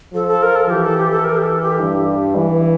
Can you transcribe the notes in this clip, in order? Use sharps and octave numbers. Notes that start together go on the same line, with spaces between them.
F3 A4
A4
A#4
A4
E3 G4
A4
G4
A4
A#4
G4
A4
G4
G2
E3